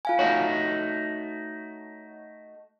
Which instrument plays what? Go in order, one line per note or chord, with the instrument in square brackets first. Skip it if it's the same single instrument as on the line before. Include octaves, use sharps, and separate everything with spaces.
[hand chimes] F4 F5 G#5
[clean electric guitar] A3 D#4 F#4 [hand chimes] C#5